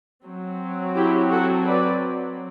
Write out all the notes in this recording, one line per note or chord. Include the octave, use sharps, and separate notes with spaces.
F#3 C4
E4 G4
F#4 A4
B4 D5